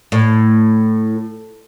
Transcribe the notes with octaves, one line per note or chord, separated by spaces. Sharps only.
A2